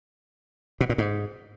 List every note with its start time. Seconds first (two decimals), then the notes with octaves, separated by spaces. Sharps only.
0.81 B2
0.89 A#2
0.98 G#2